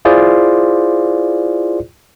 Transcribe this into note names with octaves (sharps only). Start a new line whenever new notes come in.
E4 F4 G#4 C5 D5